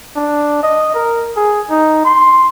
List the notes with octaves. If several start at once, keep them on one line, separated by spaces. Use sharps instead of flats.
D4
D#5
A#4
G#4
D#4
C6